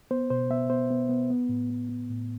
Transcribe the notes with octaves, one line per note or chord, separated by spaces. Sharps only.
B3 C5
B2 C5
B3 E5
B3 C5
B3
B3
B3
A2
B3
B3
A2